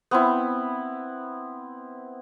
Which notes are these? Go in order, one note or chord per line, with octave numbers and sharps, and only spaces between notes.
B3 C4 E4